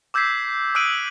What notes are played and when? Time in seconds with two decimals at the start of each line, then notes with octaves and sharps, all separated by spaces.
0.14 D6 E6 G6 G#6 B6 C7
0.75 D#6 E6 F#6 D7 D#7 F#7